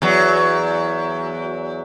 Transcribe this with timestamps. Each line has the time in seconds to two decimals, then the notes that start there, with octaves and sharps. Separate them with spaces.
0.02 E2 F#3